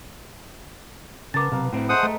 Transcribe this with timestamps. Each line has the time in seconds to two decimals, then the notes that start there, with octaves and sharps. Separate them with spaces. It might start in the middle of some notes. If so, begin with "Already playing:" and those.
1.34 C#3 B3 A#4 A5 D6 A6
1.52 B1 C3 B3 A#4 F5
1.73 A2 B3 C4 E4
1.89 G#3 A3 C5 F#5 D#6
2.03 A3 A4 D#5 A#5